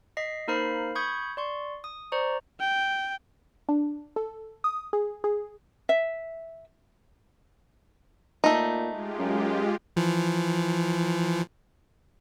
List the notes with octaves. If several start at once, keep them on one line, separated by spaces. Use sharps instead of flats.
D#5 B6 C7
A#3 D#4 A#4 C5 B5 C7
B5 C#6 D#6 G6 G#6 C#7
D5 C6 C#6
D#6
C5 D5 A#5 C#6
G5
D4
A4
D#6
G#4
G#4
E5
A#2 A3 D#4
G#3 F4 G4
F#2
E3 F3